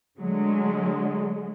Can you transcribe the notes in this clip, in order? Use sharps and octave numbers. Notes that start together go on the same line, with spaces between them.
D3 F#3 G#3 A3